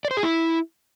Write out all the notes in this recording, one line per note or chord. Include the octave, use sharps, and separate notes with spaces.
D5
C5
G#4
E4